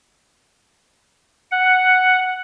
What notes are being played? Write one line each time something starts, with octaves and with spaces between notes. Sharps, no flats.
F#5